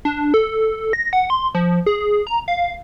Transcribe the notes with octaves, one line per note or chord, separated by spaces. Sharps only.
D4
A4
A#6
F#5
C6
F3
G#4
A#5
F5